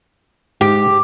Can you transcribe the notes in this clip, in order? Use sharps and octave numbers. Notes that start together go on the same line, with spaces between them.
G#2 G4